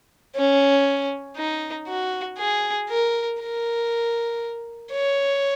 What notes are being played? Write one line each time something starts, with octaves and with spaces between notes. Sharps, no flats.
C#4
D#4
F#4
G#4
A#4
A#4
C#5